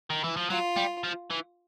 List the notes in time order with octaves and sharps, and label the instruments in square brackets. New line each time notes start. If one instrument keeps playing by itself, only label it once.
[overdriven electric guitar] D#3
E3
F3
[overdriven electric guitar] F#3 [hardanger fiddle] F4
[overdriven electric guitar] G3
F3
E3